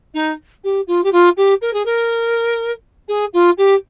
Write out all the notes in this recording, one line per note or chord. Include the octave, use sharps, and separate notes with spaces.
D#4
G4
F4
G4
F4
G4
A#4
G#4
A#4
G#4
F4
G4